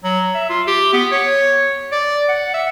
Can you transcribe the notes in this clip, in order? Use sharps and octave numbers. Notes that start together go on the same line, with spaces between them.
F#3
E5
F4
G4
B3
C#5
D5
F#5
E5